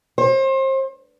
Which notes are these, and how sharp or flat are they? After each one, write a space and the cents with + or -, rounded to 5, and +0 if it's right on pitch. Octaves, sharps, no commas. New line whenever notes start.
C5 +35